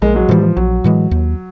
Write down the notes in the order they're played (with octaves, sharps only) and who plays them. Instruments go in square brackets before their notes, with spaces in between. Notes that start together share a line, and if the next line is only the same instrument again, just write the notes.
[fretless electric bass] A#1 [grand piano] G#3 A#3
[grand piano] F#3 G#3
[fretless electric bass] A2 E3 G#3 [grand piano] F3 G3
[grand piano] F3
[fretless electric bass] A#1 [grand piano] F#3
[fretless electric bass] A2 E3 G#3
D#2